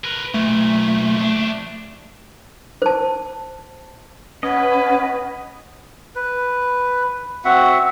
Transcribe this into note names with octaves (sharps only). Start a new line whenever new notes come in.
A#4 B4
B1 A#2 A3
F2 D4
C5 A5
C#4 B4 D#5 F#5
B4
C4 F#4 E5 F#5